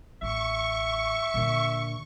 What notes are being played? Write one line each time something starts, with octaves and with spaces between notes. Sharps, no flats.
A1 E5 C#6
A#2 D3